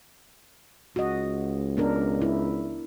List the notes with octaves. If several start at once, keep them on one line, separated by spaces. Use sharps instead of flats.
C#2 F#4 D#5
B3 D4 A#4
E4